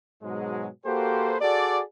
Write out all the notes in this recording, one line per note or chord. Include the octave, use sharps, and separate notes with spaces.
G#2 B2 F#3 G#3
A#3 F#4 G4 A4 B4 C5
F#4 G#4 A4 D5